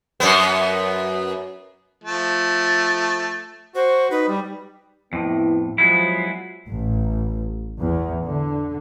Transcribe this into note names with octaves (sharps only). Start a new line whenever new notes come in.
F#2 B3
F3 A3
F#4 C5
D#4 B4
G3
F2 A2 B3 E4
F3 F#3 G#3 B3 E4
A1
E2
D3